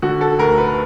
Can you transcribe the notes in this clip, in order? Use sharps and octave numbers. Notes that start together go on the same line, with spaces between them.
D3 F#4
A4
D2 A#4
B4